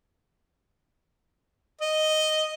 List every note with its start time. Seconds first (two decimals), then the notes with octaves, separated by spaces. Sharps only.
1.81 D#5